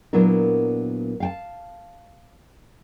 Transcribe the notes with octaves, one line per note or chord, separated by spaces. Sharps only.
A#2 F#3 B3 D4 E4 A#4
F5 G5 A5